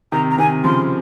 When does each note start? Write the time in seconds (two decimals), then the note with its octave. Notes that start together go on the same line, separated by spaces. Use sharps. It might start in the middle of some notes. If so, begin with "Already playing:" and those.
0.12 C3 D#3 A#5
0.31 A#5
0.38 C3 D#3 G#5
0.64 C#3 F3 C6